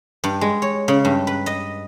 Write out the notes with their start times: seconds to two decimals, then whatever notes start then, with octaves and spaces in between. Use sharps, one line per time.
0.24 G2
0.41 G#3
0.62 C#5
0.88 C#3
1.05 G2
1.27 B4
1.46 D#5